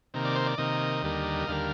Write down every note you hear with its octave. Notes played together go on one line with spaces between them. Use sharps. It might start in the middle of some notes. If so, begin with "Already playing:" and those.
C3 D#3 A#3
D5
C5
D5
C3 D#3 A#3 D#5
D#2 D3 G3 A#3
D#2 D3 G3 A#3 F5